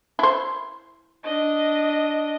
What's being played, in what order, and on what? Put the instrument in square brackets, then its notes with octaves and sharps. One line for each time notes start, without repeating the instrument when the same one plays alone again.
[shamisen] E4 C5
[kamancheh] D4 D#5